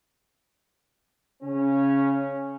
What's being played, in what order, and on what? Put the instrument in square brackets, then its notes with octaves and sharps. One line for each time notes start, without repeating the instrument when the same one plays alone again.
[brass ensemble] C#3 C#4